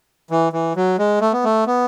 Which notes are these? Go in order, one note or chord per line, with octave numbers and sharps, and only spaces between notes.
E3
E3
F#3
G#3
A3
B3
A3
B3